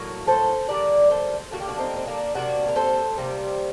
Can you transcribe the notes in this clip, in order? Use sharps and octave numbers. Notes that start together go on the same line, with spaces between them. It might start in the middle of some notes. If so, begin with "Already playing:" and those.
Already playing: A2 F#3 A#3 F#4
A4 C5
D3 G3 A#3 A#4 D5
A4 C5
D3 G3 A#3 F#4
G4
D4 F#4
C4 D#4
C4
A#3 D4
C3 G3 A#3 D4 F#4
A#4
A4 C5
C3 G3 A#3